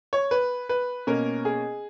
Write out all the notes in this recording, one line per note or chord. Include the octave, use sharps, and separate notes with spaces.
C#5
B4
B4
B2 A#3 C#4 A#4
G#4